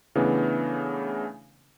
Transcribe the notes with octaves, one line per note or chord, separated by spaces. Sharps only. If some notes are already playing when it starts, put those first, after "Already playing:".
C#3 E3 A3 B3 D4